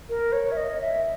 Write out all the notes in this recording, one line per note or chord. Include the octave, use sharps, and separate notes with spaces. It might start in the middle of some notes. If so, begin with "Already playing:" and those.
A#4
C#5
E5
D#5
E5